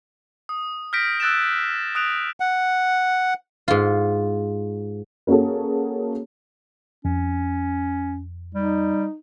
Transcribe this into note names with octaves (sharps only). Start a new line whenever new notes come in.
D#6
F6 G6 A#6 B6 D7
E6 F#6 A6 D7 E7
D#6 F#6 D7 F7
F#5
G#2 F4
A#3 C#4 F#4 G#4 A4
F2 C#4
G3 D#4